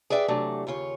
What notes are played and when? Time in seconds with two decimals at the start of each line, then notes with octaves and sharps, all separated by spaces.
0.10 G#4 B4 D5 E5 G5
0.28 C3 E3 F#3 A3 D4
0.67 D#2 C#3 F4 C#5